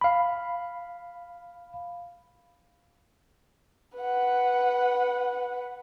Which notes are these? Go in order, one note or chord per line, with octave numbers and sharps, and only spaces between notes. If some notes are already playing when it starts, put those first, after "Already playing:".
F5 B5
B4 F#5